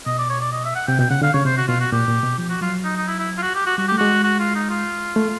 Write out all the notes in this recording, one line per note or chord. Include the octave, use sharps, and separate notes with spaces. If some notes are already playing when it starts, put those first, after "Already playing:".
B2 D#5
D5
C#5
D5
D#5
E5
F#5
C3 G5
B2 G5
C#3 F#5
D3 F5
C#3 C#5
C3 C5
F#4
B2 F4
F#4
A#2 G4
A#2
B2
F3 G4
F#4
F#3 F4
D#4
D#4
E4
E4
F4
F#4
G4
F#4
G3 F#4
A3 G4
G#3 F#4
F#4
F4
D#4
F4
A3